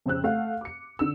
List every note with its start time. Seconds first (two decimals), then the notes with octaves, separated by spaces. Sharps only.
0.06 F2 C#3 C5 E6 F#6
0.24 A3 F5 F#5
0.61 D6 C#7
0.99 D3 E6